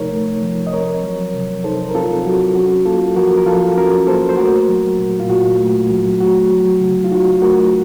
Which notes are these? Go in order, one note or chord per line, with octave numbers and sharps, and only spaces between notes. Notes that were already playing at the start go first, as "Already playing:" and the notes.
Already playing: C3 F3 A3 D#4 A#4 C#5
A3
F3
D#5
C4 A#4 C#5
F#3
C3
D#4 A4 C5
A#4
C4 F4 A4
F#3 F#4
C#4 F#4
A#3 F4 A4
F3 F#4 A#4
A#4
F3 F4 A4
C#4 F#4 A#4
A#3 A4 C5
C5
A3 F#4 A#4
F#3
A#2
F4
A#2 F#4
A3
F#3
A3 F#4
F#3
C#3
F4
D#4 F#4
A3 F#4 A#4